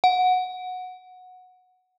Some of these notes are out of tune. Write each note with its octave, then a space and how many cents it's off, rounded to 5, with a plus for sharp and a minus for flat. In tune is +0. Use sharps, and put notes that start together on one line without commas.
F#5 -10